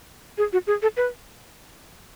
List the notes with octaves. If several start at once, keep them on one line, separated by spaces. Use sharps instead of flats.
G#4
F#4
G#4
A4
B4